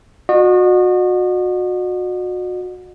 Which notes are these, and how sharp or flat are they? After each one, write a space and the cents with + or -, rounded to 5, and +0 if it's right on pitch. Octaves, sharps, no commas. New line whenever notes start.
F#4 -30 D#5 -40